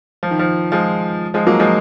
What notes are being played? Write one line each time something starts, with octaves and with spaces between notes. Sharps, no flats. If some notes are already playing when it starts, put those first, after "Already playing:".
F3
D#3
F3
F3 G#3
F3 G#3
F#3 A#3
F3 G#3